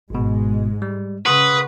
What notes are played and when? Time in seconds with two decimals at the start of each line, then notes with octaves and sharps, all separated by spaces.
0.10 G#1 G#2 B2 G#3
0.82 G3
1.26 C#3 B4 F#5 C6 C#6 D#6